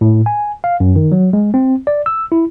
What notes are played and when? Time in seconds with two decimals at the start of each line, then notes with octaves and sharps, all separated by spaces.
0.01 A2
0.26 G#5
0.64 F5
0.80 F#2
0.96 D#3
1.12 F#3
1.33 G#3
1.54 C4
1.87 D5
2.06 E6
2.32 E4